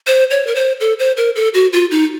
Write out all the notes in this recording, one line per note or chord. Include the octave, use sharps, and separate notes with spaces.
C5
C#5
A#4
C5
A4
C5
A#4
A4
F#4
F4
D#4